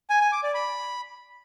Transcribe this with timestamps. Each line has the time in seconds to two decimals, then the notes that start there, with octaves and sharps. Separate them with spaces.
0.10 G#5
0.21 G#5
0.32 D6
0.43 D5
0.54 B5